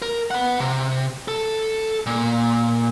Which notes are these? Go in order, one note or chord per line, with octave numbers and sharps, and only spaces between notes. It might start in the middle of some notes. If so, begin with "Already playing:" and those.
A#4
B3 F#5
C3
A4
A#2